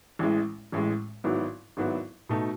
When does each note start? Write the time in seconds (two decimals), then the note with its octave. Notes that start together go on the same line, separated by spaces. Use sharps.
0.19 A1 A2 E3 G#3
0.72 A1 A2 E3 G#3
1.24 G#1 G#2 F#3 B3 E4
1.77 G#1 G#2 F#3 B3 E4
2.29 B2 A3 D#4 A4